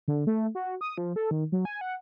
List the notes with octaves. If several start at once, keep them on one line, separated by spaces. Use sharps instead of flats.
D3
A3
F#4
D#6
F3
A4
D#3
F#3
G#5
F#5